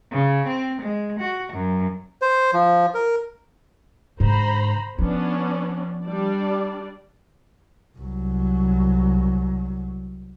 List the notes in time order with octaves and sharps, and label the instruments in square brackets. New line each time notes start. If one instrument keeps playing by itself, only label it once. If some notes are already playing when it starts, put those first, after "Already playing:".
[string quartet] C#3
C4
G#3
F#4
F#2
[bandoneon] C5
F3
A#4
[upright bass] G#2 D3 [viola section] C5 A#5 B5
[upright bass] F3 [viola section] B3 C#4 D4
[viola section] G3 D4 D5
[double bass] C2 F#3